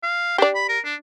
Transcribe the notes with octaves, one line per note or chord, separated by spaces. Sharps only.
F5
D4 G4 D5
B5
A#4
D4